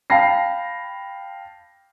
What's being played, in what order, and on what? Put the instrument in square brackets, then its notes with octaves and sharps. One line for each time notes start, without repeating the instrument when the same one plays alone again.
[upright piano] F5 G5 A5 B5 A#6 C7